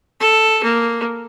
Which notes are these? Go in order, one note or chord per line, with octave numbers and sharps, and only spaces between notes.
A4
A#3